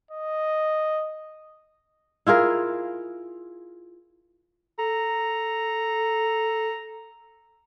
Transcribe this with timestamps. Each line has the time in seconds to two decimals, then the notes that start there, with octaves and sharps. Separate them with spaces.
0.11 D#5
2.27 E4 F4 G#4 A#4
4.79 A4 A#5